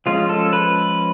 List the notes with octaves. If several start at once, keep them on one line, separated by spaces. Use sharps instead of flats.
F3 G#3 C#4 F4
A4
B4